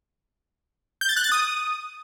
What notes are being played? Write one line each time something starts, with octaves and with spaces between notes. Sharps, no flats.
G6
A6
F#6
A6
D#6